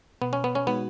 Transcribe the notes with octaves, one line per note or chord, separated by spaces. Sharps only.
B2 B3
C#4
B3
C#4
G#3 B3 D#4 F#4